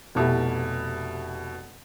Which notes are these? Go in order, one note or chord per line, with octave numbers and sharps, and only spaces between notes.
F1 B2 E4 G4